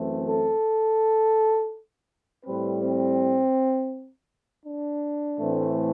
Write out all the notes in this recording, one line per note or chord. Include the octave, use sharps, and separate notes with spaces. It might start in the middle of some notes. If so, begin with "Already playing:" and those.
Already playing: F#2 E3 A3 C4
A4
A2 G3 C4 B4
C4
D4
A2 E3 A3 C4